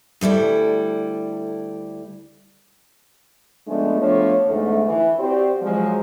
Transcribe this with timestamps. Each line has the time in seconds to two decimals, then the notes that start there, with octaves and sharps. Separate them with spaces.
0.21 D2 G3 E4 A4
3.68 C#3 F3 G#3 A3 B3 D4
4.00 F3 A3 B3 D4 C#5
4.47 E2 G#2 D3 A3
4.86 E3
5.19 C4 F#4 G4 C5 D5
5.62 F3 F#3 G#3